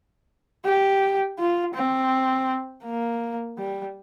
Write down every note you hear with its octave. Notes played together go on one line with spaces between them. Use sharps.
G4
F4
C4
A#3
G3